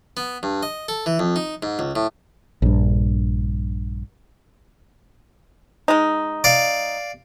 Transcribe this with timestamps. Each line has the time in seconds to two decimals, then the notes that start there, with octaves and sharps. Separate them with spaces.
0.17 B3
0.43 G2
0.63 D#5
0.88 A4
1.06 E3
1.19 F2
1.36 D#4
1.63 G#2
1.79 C#2
1.96 A2
2.62 A#1 G2
5.88 G#3 D#4
6.44 D5 F5